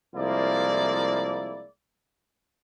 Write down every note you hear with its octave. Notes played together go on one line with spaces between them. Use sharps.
C2 F3 G#3 A#3 E4 D5